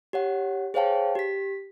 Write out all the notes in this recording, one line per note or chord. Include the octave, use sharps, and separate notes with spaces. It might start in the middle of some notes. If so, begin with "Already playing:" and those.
G4 C#5 F#5
G#4 C5 C#5 F5 G5 A5
G4 B6